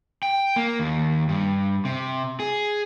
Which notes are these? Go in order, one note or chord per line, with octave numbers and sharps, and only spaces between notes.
G5
A#3
D#2
G2
C3
G#4